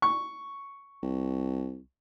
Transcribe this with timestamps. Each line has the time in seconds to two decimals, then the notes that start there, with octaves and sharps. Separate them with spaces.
0.02 C#6
1.03 C2